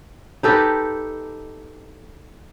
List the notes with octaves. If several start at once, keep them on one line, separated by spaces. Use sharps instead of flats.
D#4 G4 A4 B4